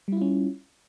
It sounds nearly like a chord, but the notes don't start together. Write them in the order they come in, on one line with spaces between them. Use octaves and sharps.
G3 E4 F4 C#4